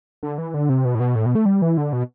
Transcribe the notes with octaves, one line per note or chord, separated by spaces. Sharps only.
D3
E3
D3
C3
B2
A2
B2
A2
B2
A3
G3
E3
D3
B2